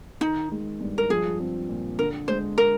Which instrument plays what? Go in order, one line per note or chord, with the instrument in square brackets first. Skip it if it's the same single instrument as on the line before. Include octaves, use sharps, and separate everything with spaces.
[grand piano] D#3 [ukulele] D#4
[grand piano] G#3
G2
[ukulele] A#4
[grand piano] F3 [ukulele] G#4
[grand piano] C4
A#2
[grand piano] D3 [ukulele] A#4
[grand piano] G#3 [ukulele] C5
[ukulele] A#4